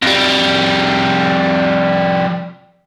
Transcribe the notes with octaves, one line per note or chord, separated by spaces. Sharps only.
F2 G3